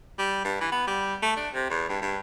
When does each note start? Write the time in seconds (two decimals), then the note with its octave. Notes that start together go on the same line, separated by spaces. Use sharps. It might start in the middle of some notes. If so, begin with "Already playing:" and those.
0.19 G3
0.44 G2
0.61 E3
0.72 B3
0.87 G3
1.22 A3
1.37 D4
1.54 C3
1.70 E2
1.89 G2
2.02 G2